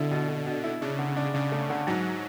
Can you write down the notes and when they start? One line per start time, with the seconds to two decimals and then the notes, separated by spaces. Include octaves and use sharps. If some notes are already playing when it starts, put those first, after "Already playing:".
Already playing: B2 D3 E4
0.11 B2
0.28 B2
0.47 B2
0.64 E4
0.81 C#3 D4
0.99 D3
1.17 D4
1.34 C#3 D4
1.52 A3
1.70 D3
1.87 G#2 F#3